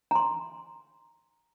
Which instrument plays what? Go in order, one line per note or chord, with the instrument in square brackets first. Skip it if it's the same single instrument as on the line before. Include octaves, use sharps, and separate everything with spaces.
[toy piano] A#5 C6